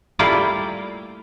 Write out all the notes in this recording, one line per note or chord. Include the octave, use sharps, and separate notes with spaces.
G3 A3 A#3 E4 F4 D5